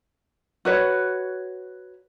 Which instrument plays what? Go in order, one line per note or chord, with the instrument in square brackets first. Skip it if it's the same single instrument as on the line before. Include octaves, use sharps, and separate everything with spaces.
[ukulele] F#4 B4 C#5